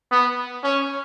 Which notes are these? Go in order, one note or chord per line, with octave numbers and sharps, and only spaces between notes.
B3
C#4